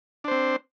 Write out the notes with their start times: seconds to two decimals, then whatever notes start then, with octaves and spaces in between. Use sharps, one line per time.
0.24 D4
0.28 C5
0.32 C4